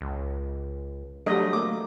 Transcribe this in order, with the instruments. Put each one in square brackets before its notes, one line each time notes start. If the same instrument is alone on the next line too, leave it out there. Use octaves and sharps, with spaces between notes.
[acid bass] C#2
[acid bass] F#3 [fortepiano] G3 A3 [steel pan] D4 D#5
[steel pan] A3 A#3 [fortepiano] D6